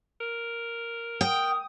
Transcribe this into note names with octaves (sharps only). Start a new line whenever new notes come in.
A#4
G5 D#6